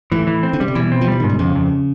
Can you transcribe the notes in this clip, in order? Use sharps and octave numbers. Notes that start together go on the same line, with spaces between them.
A2 E3
E3
C4
D3
C#3 G3
C3
B2 E3
C4
F3
E3 G3
G#2 D#3
D3
F2 C#3
F2